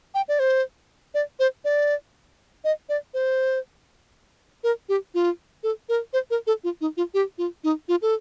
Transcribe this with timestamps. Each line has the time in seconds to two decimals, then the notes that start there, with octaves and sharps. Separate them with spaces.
0.14 G5
0.28 D5
0.39 C5
1.14 D5
1.39 C5
1.65 D5
2.64 D#5
2.89 D5
3.14 C5
4.64 A#4
4.89 G4
5.14 F4
5.63 A4
5.89 A#4
6.13 C5
6.30 A#4
6.47 A4
6.64 F4
6.81 D#4
6.97 F4
7.14 G4
7.38 F4
7.64 D#4
7.88 F4
8.02 A4